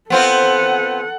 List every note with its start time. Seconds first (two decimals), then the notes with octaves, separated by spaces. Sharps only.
0.10 B3 C4 F4 A4 F#5